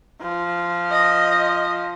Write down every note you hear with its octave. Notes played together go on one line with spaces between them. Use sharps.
F3
D#5